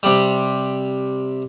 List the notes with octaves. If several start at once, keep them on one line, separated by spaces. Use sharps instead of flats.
C3 G3